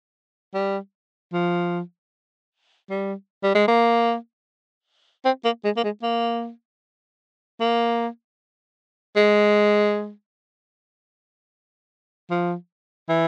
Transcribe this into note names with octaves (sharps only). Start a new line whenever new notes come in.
G3
F3
G3
G3
G#3
A#3
C4
A#3
G#3
A#3
G#3
A#3
A#3
G#3
F3
E3